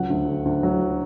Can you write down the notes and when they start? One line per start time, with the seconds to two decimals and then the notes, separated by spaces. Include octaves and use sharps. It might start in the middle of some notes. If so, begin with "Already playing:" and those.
Already playing: C#2 F#3 F#5
0.10 D2
0.28 D3
0.45 D2
0.63 F#3